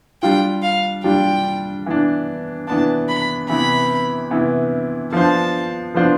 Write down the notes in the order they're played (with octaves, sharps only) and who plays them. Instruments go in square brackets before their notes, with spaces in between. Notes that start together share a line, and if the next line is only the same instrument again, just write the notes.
[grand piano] G3 D4 F4 [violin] G5
[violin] F5
[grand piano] G3 D4 F4 [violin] G5
[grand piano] E3 B3 D4
[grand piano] E3 B3 D4 [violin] A5
[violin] B5
[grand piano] C3 E3 B3 E4 [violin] B5
[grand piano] C3 E3 B3 E4
[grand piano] F3 B3 D4 F4 C5 [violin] A5
[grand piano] F3 B3 D4 F4 C5